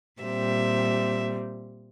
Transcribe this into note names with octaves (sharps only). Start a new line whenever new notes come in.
A#2 G3 C4 E5